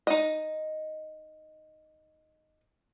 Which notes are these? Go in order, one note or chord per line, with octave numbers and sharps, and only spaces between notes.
D#4 D#5